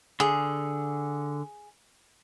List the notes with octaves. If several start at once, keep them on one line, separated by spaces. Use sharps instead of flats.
D3 G#4